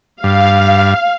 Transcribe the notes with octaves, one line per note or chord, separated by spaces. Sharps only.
G2 F5